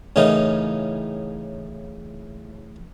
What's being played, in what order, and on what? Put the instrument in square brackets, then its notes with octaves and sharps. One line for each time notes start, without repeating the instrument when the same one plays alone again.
[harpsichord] A2 C#3 E3 D#4 A#4